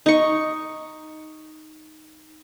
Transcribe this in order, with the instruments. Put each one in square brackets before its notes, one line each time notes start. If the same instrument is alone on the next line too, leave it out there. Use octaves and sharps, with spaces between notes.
[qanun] D#4 C#6